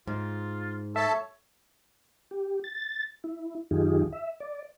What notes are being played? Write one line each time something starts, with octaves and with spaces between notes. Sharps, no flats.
G#2 F4
A4 C#5 E5 A5
G4
A6
E4
F#2 D#3 D#4 F4 G4 G#4
E5
D5